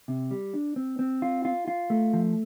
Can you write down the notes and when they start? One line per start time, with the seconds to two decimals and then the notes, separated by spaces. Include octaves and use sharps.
0.08 C3
0.31 G3
0.54 D4
0.76 C4
0.99 C4
1.22 F4
1.45 F4
1.68 F4
1.90 A3
2.13 F3